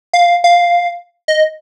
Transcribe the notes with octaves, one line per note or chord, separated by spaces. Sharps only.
F5
F5
D#5